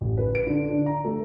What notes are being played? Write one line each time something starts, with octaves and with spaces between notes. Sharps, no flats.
A1
B4
D7
D3
D4
A#5
A3